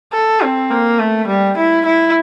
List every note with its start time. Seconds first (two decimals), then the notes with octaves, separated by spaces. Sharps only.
0.12 A4
0.41 C4
0.70 A#3
0.99 A3
1.27 G3
1.57 E4
1.86 E4